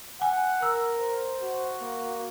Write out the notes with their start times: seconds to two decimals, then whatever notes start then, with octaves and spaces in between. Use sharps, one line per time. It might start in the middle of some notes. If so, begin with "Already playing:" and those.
0.22 F#5 G#5
0.63 A#4 E6
1.00 C5
1.42 F#4
1.81 A#3